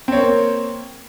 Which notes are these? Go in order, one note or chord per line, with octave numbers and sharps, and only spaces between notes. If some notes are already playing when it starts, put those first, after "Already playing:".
A#3 C4 C#5